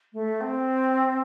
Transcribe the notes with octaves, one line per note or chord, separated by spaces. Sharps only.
A3
C4